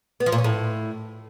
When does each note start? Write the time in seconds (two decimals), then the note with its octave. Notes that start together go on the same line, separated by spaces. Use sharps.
0.20 B3
0.26 F3
0.32 A#2
0.38 C#4
0.44 A2